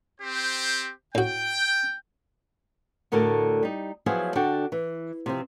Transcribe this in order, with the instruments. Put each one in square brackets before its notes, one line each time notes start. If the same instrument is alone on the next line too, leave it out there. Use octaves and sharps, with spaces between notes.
[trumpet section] C4 G4 C5
[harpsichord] A2 F#4 [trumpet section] G5
[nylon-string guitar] D2 A2 D3 A4 A#4 A5
G3 D#4
F3 F#3 B3 E4 F4 G#4
D3 D4 F#4 A4 G5
E3
C3 F3 C4